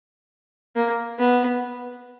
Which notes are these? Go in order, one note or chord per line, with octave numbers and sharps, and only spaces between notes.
A#3
B3